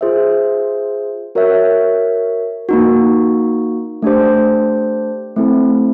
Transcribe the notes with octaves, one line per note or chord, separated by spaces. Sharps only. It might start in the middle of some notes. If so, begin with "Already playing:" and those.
F4 G#4 C5 E5
F#4 A#4 C#5 E5
A#3 D#4 F#4
A3 D4 G4 C5
A3 C4 E4 A4